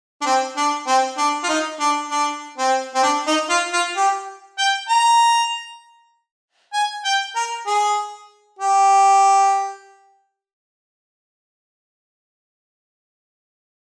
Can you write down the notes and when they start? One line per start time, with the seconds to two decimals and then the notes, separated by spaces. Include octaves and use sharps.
0.21 D4
0.26 C4
0.56 D4
0.87 C4
1.18 D4
1.44 F4
1.49 D#4
1.80 D4
2.10 D4
2.58 C4
2.95 C4
3.03 D4
3.27 D#4
3.49 F4
3.73 F4
3.97 G4
4.58 G5
4.89 A#5
6.73 G#5
7.05 G5
7.36 A#4
7.67 G#4
8.59 G4